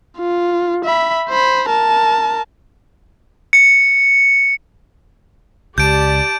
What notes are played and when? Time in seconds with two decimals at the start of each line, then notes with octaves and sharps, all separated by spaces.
0.19 F4
0.84 E5 B5
1.29 C5 B5
1.69 A#4 A5
3.53 C#7
5.78 C#2 G4 D5 A5 G6 D7